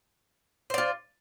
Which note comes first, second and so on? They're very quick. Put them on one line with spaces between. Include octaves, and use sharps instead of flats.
C5 D5 F4